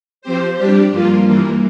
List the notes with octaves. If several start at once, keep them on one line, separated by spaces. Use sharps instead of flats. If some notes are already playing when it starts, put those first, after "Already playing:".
F3 C4 G4 C5
G3 D4 G4
G2 F3 A#3 F4
G2 E3 A#3